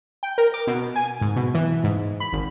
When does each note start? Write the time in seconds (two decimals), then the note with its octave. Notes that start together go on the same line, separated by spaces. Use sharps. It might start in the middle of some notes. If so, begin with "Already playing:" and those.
0.23 G5
0.38 A#4
0.54 D6
0.67 B2
0.96 G#5
1.21 G#2
1.36 B2
1.54 E3
1.84 G#2
2.20 B5
2.33 G#1